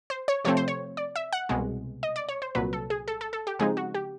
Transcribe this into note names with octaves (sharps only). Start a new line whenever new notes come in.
C5
C#5
C3 F3 A3 C4 C#5
C5
C#5
D5
E5
F#5
C2 B2 G#3
D#5
D5
C#5
C5
C2 A#2 F#3 B4
A4
G#4
A4
A4
A4
G4
C#3 F3 G#3 C4 D#4 G#4
F#4
G4